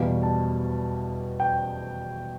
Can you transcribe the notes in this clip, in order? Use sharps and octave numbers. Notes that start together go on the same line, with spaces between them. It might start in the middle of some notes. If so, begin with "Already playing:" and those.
Already playing: E2 B2 G3 F5
A5
G5